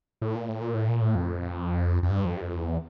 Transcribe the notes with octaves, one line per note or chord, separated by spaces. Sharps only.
A2
A#2
A2
A#2
A2
A#2
A2
F2
F2
G2
F2
G2
F2
E2